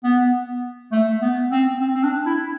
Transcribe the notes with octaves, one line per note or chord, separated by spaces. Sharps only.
B3
A3
B3
C4
C4
C4
D4
E4